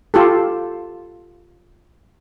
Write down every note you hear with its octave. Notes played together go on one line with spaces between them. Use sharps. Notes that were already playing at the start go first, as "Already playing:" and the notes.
F4 G4 A4